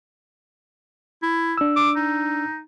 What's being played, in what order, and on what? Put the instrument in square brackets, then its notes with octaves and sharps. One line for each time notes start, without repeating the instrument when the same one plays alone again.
[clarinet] E4
[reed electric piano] D4 E6
[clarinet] D6
D#4